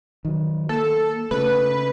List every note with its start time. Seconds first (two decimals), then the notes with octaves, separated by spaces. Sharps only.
0.25 D#3 F#3
0.69 A#3 A4
1.31 C#3 A3 B4